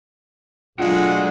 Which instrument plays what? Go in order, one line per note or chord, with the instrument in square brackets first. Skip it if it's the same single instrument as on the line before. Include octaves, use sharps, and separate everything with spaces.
[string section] B1 F#3 A3 [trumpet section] G#3 F#5 [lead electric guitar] D4 F#4 [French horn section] F4